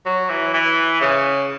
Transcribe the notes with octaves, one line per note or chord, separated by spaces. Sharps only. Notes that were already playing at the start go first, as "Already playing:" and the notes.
F#3
E3
E3
C#3